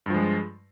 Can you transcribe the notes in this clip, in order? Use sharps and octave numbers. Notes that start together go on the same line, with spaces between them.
G2 F3 G#3